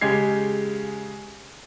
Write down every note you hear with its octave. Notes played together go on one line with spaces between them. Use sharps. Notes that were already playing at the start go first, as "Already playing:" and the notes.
C#3 G#3 G4 G#6 C7